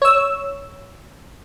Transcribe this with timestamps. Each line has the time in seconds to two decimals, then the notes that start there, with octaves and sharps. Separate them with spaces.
0.02 C#5 E6